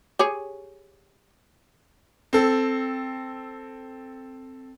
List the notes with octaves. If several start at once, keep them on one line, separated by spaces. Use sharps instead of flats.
G4 G#4 C#5
C4 A4